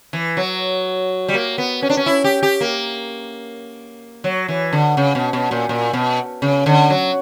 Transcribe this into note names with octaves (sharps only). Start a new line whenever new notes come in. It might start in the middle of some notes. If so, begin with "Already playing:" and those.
E3
F#3
G3
A#3
B3
C#4
D4
C#4
E4
G4
G4
A#3
F#3
E3
D3
C#3
B2
B2
A#2
A#2
B2
C#3
D3
F#3